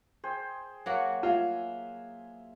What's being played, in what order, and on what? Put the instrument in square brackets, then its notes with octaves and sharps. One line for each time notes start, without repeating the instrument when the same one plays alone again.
[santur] G#4 C5 G5
[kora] F#3 A#3 F#4
[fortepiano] F4 [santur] E5 G#5